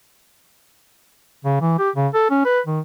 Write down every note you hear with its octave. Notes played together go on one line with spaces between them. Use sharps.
C#3
E3
G4
C#3
A4
C#4
B4
D#3